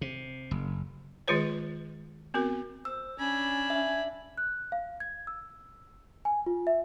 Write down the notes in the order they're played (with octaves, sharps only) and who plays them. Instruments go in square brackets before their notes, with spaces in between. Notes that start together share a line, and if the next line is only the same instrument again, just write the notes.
[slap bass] C3
F#1
[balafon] D#3 G#3 F4 G#4 B4 C#5
B3 C4 F#4 A#4
[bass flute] C5 [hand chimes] E6
[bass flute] C#4 [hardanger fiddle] D4 B5 [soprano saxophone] G#5
[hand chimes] E5
[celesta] F#6
F5
G#6
E6
G#5
F4
E5